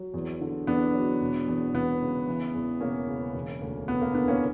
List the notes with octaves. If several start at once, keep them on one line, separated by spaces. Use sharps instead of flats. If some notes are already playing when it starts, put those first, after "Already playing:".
Already playing: F#3
E2
D3
E2 B3 D4
F#3
E1
E2
E1 B3
C#3
E3
E2
E1 A#3 C#4
C#3
E1
D2
E1 B3
A#3
D3 B3
A#3 C#4